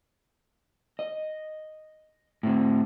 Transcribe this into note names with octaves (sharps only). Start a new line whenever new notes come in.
D#5
A2 C4